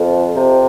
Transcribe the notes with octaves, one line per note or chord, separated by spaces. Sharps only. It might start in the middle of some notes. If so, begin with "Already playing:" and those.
Already playing: F2
C3